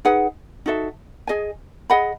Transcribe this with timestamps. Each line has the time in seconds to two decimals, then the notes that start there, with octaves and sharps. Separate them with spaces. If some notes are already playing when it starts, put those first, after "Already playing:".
0.05 D#4 G#4 B4 F#5
0.66 D#4 F#4 A4 E5
1.27 G#4 D#5 G#5
1.90 G#4 D#5 F#5 B5